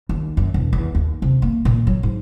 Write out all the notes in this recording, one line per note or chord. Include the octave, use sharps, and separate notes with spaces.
D#2
F#2
E1
E2
D#2
C3
A#3
A#2
F#3
G#2